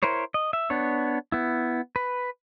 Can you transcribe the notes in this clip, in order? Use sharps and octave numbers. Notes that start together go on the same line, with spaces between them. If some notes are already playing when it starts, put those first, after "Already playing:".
E4 A#4 C5 C#5
D#5
E5
B3 D4 C#5
B3 E4
B4